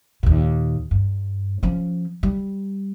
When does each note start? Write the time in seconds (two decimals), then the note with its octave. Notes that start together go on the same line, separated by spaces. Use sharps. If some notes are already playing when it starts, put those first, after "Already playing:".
0.23 D#2 A#2
0.91 G2
1.63 F3 C#4
2.23 G3